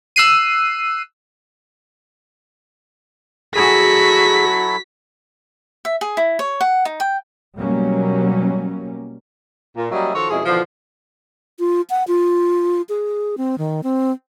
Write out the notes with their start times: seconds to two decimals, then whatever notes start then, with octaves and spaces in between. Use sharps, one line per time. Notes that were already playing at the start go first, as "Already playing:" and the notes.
0.16 E6 F#6 C7 D#7
3.56 F#3 E4 F#4 G#4 A4 B6
5.85 E5
6.01 G#4
6.17 E4
6.39 C#5
6.61 F#5
6.85 D#4
7.00 G5
7.58 B2 F#3 G3 A#3 C#4
9.77 A#2
9.91 F#3 G3 A#3 C#4 D#5 E5
10.14 D#3 F3 F4 F#4 A4 C#5
10.30 F2 B2 G#3 C#4 E4 G#4
10.45 B2 D3 E3 F3
11.59 F4
11.90 F#5
12.08 F4
12.89 G#4
13.38 C4
13.58 D#3
13.83 C4